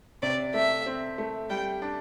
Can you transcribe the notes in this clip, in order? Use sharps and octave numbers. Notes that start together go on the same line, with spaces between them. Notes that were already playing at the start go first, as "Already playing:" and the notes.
C3 D5
A3 E5
C4
A3
G3 G5
D4